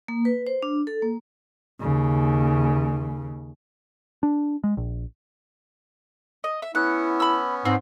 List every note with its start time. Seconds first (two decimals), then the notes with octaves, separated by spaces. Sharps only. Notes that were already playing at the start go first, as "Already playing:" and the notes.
0.08 A#3
0.25 B4
0.47 C5
0.63 D4
0.87 A4
1.02 A#3
1.81 D#2 C#3
4.23 D4
4.64 G#3
4.77 A#1
6.44 D#5
6.62 E5
6.75 B3 C#4 E4 F#5
7.20 B5 E6
7.65 G#2 C4